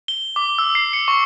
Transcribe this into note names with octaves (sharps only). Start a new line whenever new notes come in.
G7
D6
E6
C7
C#7
C#6